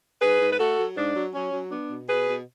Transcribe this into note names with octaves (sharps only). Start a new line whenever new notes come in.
G#2 G#4 B4
G#2
B4
A3 F#4 A4
F#3
G#2 D4
F#3
F#3 C#4
F#3
B3 D4
B2
B2 G#4 B4
B2